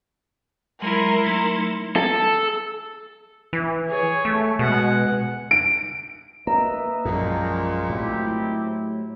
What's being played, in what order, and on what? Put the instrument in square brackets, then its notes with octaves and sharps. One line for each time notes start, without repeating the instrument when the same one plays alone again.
[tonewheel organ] F#3 G#3 [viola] E4 C6 [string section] A#4
[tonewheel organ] F#3 A3 D#4 [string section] A#4
[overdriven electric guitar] A4
[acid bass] E3
[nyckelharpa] G#4 C#5
[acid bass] A3
[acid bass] B2 [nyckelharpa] G#3 F#5
[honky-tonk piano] D7
[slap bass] A#3 [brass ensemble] B4 D#5 E5 [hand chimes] A#5
[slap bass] A#1 F#2 [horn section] A#2 G#3 [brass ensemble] D#3 F3 F#3
[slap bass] A2 F#3 [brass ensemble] C4 E4 G4